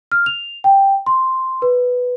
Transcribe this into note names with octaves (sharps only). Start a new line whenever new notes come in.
F6
F7
G5
C6
B4